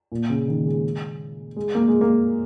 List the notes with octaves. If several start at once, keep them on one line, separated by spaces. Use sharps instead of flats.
A#2
C#3
D#3
G#3
G#3
A#3
G#3
A#3